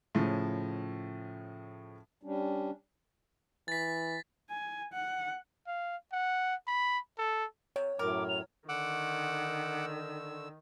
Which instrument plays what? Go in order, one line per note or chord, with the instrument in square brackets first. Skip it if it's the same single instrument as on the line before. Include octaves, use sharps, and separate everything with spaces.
[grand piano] A2 C#3 F3
[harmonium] G3 C#4 D4
[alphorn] E3 [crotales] A6 B6
[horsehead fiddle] G#5
F#5
[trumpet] F5
F#5
B5
A4
[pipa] C3 [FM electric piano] C#5
[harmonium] F#2 A2 F#3 [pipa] A#4 [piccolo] D6
[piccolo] F7
[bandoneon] D3 E6 [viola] D#3 [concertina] F#5 D6